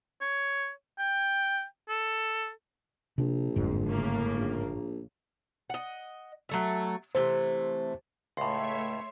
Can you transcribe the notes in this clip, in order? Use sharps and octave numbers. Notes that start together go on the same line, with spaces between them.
C#5
G5
A4
A#1 C3 D4
G1 F2 G#2 D3
A2 C#3 A#3
A#1
D#5 F#5
F#3 A3 E5
C3 E3 A3 C5
C#2 A2 A3 C#5 E5 C6 C7